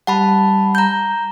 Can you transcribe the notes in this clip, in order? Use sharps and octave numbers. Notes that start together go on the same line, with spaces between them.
G3 F#5 A5 B5
A#5 G6